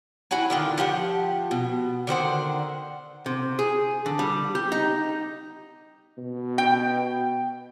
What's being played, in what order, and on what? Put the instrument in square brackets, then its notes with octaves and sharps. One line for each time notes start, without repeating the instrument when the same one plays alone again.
[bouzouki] E4 F#4 F#5 G#5
D3 D#3 F4
F3 G4 C5 F#5
B2
D3 D#3 C5 F#5
[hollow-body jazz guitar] C3
G#4
D3
G3
G4
D#4
[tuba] B2
[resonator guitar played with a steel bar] G5